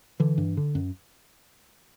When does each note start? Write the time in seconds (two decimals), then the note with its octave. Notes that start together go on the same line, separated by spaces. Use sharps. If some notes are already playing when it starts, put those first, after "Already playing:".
0.20 D3 E3
0.38 G2
0.57 D3
0.75 F#2